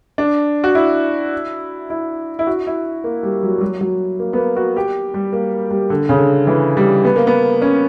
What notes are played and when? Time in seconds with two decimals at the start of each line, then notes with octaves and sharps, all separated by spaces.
0.18 D4
0.64 F#4
0.75 E4
1.90 E4
2.39 E4
2.47 F#4
2.67 E4
3.04 A#3
3.23 G3
3.43 F#3
3.58 G3
3.61 F#3
3.81 F#3
4.19 A#3
4.33 B3
4.37 A#3
4.56 F#4
4.76 G4
5.14 G3
5.33 A#3
5.71 G3
5.90 D3
6.09 C#3
6.18 D3
6.47 E3
6.77 G3
7.05 B3
7.16 A#3
7.27 B3
7.62 C#4